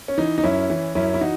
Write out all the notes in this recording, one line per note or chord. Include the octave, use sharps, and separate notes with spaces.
C#4
E3 D#4
D#4
F#2 C#4 E4
E3
F#2 C#4 E4
E4
E3 D#4 F#4